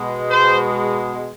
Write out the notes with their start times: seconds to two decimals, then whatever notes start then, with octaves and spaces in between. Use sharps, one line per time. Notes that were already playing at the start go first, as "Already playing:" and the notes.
Already playing: B2 G#3
0.30 C5